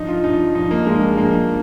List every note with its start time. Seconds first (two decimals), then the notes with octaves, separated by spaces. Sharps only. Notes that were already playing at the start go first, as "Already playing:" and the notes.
Already playing: G2 F3 D#4
0.09 F4
0.24 G2 F3 D#4
0.55 G2 F3 D#4
0.71 A#3
0.86 G2 F3 G#3
1.17 G2 F3 A#3